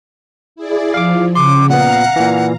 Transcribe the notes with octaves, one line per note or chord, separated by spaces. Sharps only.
E4 G#4 D5
F3 F5 D6
C#3 C6 D6
A#2 B3 F5 F#5 A#5
A#2 E3